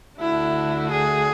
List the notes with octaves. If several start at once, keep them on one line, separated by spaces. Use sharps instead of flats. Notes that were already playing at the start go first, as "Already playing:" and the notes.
D2 D3 A3 D4 E4 F#4
G#4